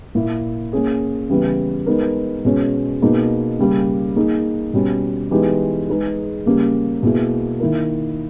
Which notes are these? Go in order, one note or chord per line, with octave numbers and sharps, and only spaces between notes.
A#2 A#3 E4
A#3 C#4 G#4
C#3 E3 G3 B3 E4
G#3 B3 D#4 A#4
B2 G#3 C#4
B2 A#3 D#4 G#4
C#3 G3 A#3
A#3 D#4 G#4
B2 G3 C#4
E3 G#3 B3 D#4 G4
G#3 D#4 G#4 B4
C#3 G3 A#3 C#4 G4
B2 A#3 E4 G#4
D#3 A#3 E4 A#4